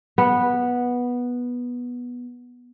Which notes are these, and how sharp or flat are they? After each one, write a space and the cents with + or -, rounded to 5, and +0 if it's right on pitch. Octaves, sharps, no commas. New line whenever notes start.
B3 -10